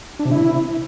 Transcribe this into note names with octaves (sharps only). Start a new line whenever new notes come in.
D4
C3
E4